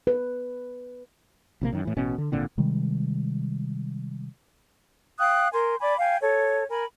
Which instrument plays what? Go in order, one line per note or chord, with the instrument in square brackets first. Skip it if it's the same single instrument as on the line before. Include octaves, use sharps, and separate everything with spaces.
[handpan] B4
[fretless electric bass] A#1 C3 A#3
F#2 D#3
A2 E3
A1 B2 C#4
D3
G#1 A#2 D3 C4
[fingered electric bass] C3 D#3 G3 G#3
[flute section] F5 G5 D#6 F#6
A#4 G#5 C6 G6
D5 G#5 B5 D6
F5 G5 G#5
A4 C#5
A#4 G#5 B5